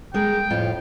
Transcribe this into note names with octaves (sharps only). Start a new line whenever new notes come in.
G#3 G#4 A#4 G5
F2 A2 F4